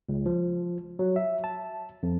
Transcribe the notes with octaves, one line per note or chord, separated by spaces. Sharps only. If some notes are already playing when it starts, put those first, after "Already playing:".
C#2
F3
F#3
E5
A5
F2